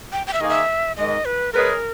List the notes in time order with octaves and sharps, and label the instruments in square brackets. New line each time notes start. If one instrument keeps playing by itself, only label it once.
[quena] G5
G5
E5
[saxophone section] D#3 A#3 D#4 G#4 [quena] D#5
[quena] E5
[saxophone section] G#2 D#3 G#3 [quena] D#5
[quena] B4
[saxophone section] G#3 C#4 G#4 B4 D#5 [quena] A#4